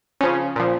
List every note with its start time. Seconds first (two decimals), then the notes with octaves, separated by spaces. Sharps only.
0.21 C#3 F3 C#4
0.56 A#2 F3